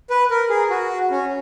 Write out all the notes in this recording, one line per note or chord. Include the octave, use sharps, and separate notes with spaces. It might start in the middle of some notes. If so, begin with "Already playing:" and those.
B4
A#4
G#4
F#4
C#4